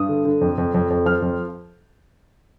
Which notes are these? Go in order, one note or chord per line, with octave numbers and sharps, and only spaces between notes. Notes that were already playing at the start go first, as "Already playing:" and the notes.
Already playing: G2 D#6
D3
D3
F2
F2
F2
F2
F3 F6
F2